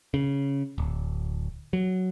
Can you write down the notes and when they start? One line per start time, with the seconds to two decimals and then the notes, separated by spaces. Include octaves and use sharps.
0.14 C#3
0.78 D1
1.73 F#3